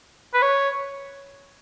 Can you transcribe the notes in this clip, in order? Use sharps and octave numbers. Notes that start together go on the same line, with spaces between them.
B4
C#5